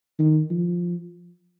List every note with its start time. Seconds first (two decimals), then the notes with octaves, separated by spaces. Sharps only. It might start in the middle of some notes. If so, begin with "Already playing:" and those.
0.19 D#3
0.50 F3